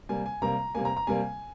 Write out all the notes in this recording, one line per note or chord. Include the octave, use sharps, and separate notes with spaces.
C3 G3 A#3 G#5
G#5
C3 G3 A#3 A#5
C3 G3 A#3 G#5
A#5
A#5
C3 G3 A#3 G#5